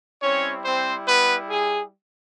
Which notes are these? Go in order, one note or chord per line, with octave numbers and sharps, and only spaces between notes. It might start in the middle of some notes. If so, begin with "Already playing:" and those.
G3 C4 C#4 E4 C#5
C4 C5
B3 B4
G#4